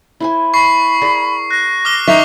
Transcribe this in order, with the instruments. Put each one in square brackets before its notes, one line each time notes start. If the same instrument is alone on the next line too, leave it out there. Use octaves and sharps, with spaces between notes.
[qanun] E4 C5 G#5
[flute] B5 [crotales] C#6 C7
[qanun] G#4 A#4 D5
[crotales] F#6 [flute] A#6
[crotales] D6 F6 G7
[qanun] D#3 [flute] D#4 [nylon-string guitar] D#5 E5 [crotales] C#6 C7 F7